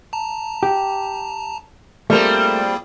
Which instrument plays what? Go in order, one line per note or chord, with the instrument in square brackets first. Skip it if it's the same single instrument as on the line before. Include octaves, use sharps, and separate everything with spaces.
[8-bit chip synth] A5 A#5
[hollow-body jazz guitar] G4
[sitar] G3 C4 [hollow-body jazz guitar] A3 A#4 [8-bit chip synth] A#3 F4 G#4